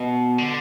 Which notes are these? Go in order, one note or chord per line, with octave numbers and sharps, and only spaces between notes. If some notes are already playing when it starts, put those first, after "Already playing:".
Already playing: B2
D3